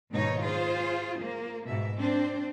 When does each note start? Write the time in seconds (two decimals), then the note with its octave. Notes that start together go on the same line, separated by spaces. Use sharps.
0.13 D#2 G#2 B2 D#4 C#5
0.43 F4 G#4 C5
1.21 A#3
1.66 G#2 B2 E5
1.97 C4 D4 C5